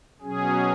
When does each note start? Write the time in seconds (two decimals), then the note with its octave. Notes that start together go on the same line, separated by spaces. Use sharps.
0.21 B2 F#3 C#4 G#4